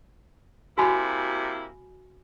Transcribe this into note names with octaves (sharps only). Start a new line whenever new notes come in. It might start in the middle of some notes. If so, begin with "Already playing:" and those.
C3 A#3 E4 F#4 G#5 B5